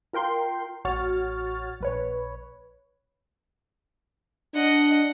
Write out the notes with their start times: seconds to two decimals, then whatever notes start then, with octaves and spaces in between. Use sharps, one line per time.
0.13 F4 A#4 G5 C6
0.85 A1 F#4 C#5 F6 A6
1.80 A#1 B4 C#5
4.54 D4 D#5 F#5